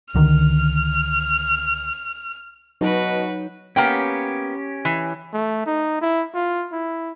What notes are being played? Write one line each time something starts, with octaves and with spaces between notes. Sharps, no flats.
C#2 D3 D#3 F6
B2 F#3 D#4 F#4 B4
A#3 B3 C#4 G4 G5
E3
A3
D#4
E4
F4
E4